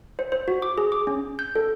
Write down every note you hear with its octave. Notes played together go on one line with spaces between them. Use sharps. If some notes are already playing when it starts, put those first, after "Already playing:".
C5
C5
F#4
D6
G#4
D6
C#4
G6
A4